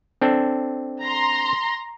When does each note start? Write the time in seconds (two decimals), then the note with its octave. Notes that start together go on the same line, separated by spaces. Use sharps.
0.21 C4 D4 A4
1.01 A#5 C6